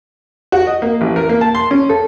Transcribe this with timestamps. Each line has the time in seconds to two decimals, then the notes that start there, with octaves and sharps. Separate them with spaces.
0.52 F#4
0.67 D#5
0.82 A#3
1.01 A1
1.16 A#4
1.29 A#3
1.41 A5
1.55 C6
1.71 C#4
1.89 A4